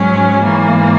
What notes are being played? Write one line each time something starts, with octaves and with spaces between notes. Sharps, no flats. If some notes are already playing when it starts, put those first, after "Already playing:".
Already playing: G#2 F#3 C#4
G#2 E3 A#3